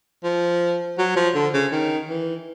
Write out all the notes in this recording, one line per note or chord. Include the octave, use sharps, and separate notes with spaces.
F3
F#3
F3
D3
C#3
D#3
E3